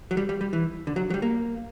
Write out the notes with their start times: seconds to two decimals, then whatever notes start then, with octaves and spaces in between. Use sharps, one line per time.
0.11 F#3
0.17 G3
0.29 G3
0.41 G3
0.53 E3
0.87 D3
0.96 F#3
1.10 F#3
1.14 G3
1.22 A#3